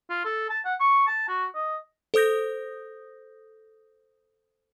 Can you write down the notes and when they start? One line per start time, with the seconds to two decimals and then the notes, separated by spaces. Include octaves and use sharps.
0.10 F4
0.25 A4
0.50 A5
0.65 F#5
0.80 C#6
1.07 A5
1.29 F#4
1.55 D#5
2.14 A4 C5 D#6 G6 A#6